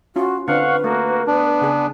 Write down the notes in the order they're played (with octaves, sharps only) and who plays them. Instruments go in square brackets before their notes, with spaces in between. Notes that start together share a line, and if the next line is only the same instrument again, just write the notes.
[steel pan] C#4 F4 [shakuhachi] F#4
[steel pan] D3 C4 D4 [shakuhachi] B4 [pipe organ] F5 F#5 C#6
[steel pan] A3 [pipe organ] A#3 F#4
[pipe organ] B3 [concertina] D4
[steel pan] C#3 G#4